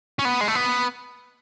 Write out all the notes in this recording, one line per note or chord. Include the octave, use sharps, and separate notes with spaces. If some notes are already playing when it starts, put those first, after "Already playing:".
C#4
B3
G#3
A3
B3